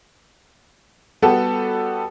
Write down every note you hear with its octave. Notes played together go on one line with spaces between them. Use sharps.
G3 B3 F#4 G4 A4